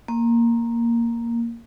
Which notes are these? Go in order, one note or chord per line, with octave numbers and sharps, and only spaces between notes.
A#3